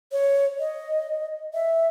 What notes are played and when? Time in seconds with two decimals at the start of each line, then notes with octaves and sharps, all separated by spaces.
0.12 C#5
0.59 D#5
1.54 E5